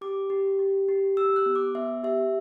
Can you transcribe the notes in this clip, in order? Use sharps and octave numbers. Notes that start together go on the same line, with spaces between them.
G4 D6
G4
G4
G4
G4 E6
F#6
B3
D6
B3 E5
G4 E5